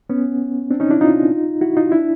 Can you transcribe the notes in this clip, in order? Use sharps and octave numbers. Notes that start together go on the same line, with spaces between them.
B3 C#4
C4 D4
C#4 D#4
D4 E4
D#4 F4
E4 F#4
D#4 F4
D4 E4